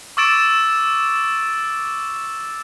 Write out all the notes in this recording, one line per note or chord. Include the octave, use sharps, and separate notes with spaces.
C#6 D6 E6 A6 D7 E7